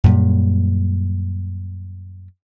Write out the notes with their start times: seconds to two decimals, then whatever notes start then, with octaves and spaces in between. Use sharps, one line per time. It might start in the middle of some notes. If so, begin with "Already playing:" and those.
0.04 F#2 A#2 G3